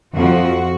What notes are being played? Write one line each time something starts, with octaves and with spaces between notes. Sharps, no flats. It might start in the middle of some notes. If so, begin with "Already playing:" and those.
F2 F3 F#4